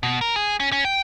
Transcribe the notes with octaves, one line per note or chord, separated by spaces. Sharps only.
B2
A#4
G#4
C#4
C#4
G5